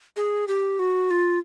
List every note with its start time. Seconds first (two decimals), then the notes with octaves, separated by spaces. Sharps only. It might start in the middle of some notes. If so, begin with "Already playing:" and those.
0.17 G#4
0.48 G4
0.79 F#4
1.11 F4